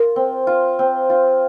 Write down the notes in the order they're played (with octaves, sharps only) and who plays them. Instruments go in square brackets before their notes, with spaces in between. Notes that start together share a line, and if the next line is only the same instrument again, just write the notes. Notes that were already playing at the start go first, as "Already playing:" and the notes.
Already playing: [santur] F4 [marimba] A#4
[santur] C4
F4
C4
F4